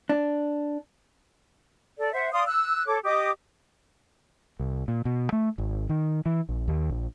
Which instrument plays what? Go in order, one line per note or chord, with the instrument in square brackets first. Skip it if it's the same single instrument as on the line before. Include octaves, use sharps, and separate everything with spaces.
[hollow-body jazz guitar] D4
[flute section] A4 D5
C5 E5 F#5
D5 F5 C6 D#6
E6 F#6
A4 C#5 D6
G4 D#5 D6 D#6
[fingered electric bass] C2
A#2
B2
A3
G#1
D#3
E3
A#1
D#2
A#1